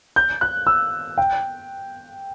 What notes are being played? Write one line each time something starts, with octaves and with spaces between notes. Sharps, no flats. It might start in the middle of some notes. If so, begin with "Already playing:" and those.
G6
F#6
E6
G5